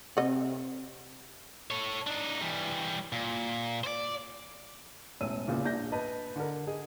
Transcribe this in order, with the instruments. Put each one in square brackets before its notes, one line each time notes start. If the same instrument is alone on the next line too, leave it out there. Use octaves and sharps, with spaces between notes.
[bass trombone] C3 [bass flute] C4 [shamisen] D#5 F#5
[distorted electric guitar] A4 C#5
D4 D#4
E3 G3
A#2
C5 D5
[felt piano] E1 A2 C#4 E6 D#7
E2 A#2 C#3
A#1 D4 G6 A#6
B4 D#5 A5 B5
D3 A#4
G#4 D#5